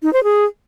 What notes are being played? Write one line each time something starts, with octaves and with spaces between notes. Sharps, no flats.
D#4
C5
G#4